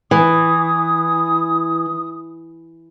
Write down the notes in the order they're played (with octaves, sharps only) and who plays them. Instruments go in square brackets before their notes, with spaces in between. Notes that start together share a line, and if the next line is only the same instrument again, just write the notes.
[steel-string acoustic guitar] E3 [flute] D#6